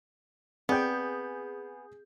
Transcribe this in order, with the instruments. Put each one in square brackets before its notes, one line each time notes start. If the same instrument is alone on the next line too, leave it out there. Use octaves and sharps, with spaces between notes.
[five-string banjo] B3 [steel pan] C4 D5 G5 [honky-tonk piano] G#4 G6